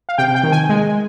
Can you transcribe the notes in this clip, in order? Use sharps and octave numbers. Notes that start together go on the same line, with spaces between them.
F5
C3 G5
G5
D#3
G#5
G#3